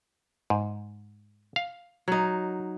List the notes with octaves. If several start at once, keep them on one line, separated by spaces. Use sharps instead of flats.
G#2
F5
F#3 D#4